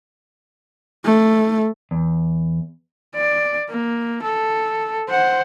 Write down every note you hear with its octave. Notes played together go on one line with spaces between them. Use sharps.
A3
E2
D5
A#3
A4
C5 F#5